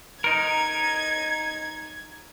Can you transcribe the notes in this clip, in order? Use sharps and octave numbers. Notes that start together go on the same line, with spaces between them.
D#4 A#4 G#6